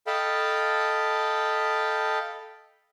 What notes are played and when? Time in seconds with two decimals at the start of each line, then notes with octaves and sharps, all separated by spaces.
0.07 A4 D#5 F5 G5 A5 B5